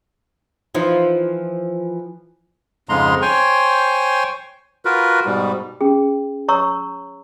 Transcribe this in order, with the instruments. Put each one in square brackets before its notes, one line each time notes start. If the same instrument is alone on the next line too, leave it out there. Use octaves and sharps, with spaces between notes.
[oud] E3 F3 D#4
[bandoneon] F2 G#2 C#3 G#3 A#5 C6
C5 C#5 G5 G#5 C6 C#6
F4 F#4 A#4 B4
G#2 B2 G3
[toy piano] C#4 G#4
C#5 A#5 C#6 E6